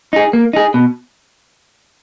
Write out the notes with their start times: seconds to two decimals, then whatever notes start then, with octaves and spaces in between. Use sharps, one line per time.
0.13 D#4 G#4
0.33 A#3
0.53 D#4 G#4
0.74 B2